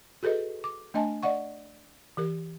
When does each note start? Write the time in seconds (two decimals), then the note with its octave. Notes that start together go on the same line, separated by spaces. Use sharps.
0.23 F#4 G#4 A4 B4 D#5
0.64 D6
0.94 A3 D4 D#5 G#5 A5
1.23 D5 D#5 F#5 C#6
2.17 E3 G4 A#4